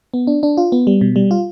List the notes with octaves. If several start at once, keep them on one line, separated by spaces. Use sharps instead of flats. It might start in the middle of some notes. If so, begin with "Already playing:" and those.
B3
D4
D4
F4
B3
G3
B2
G3
F4